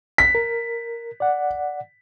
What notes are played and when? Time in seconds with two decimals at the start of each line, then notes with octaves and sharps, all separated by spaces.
0.18 B6
0.35 A#4
1.20 D5 F#5